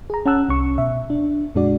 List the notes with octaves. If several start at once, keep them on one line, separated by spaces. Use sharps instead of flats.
G#4 A#5
C#4 F#5 A5 E6 F#6
C2 C#4 C#6
B2 E5
D4
F2 A#2 G#3 D4 F#4 D5